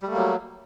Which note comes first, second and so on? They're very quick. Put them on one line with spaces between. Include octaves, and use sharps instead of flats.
G3 A3 A#3 F#3